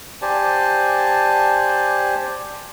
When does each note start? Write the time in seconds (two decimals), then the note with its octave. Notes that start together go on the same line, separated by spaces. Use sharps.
0.22 G4 C5 D5 G#5 A5